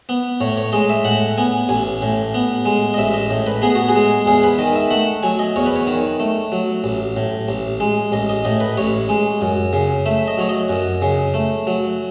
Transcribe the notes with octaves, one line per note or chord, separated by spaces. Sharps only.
B3
A2 C#5
C#5
G#3 D#5
E5
A2 F#5
B3 G#5
A1 G#5
A2
B3
G#3
D#5
A1 E5
D#5
A2
B4
B3 G#4
F#4
G#4
G#3
E2 G#4
B4
D#3 D#5
E5
A3 F#5
F#3 G#5
D#5
E2 C#5
B4
C#5
D#3
A3
F#3
A1
A2
A1
G#3
A1 D#5
D#5
A2 D#5
B4
A1 C#5
G#3
F#2
C#3
A3 E5
D#5
F#3 C#5
D#5
F#2
C#3
A3
F#3